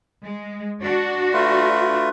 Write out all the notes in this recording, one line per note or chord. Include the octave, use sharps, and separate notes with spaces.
G#3
D4 F#4
A3 F4 B4